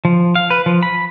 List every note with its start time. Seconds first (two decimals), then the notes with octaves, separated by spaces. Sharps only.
0.05 F3
0.35 F5
0.50 B4
0.66 F3
0.83 B5